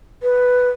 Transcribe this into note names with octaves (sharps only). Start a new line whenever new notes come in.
B4